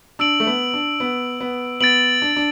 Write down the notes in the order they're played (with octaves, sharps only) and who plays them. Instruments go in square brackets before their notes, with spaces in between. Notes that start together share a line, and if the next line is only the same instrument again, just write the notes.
[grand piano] D4 [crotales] E6 D7 F#7
[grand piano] A3
B3
D4
B3
B3
[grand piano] B3 [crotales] A6 D7 F#7
[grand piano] D4
D4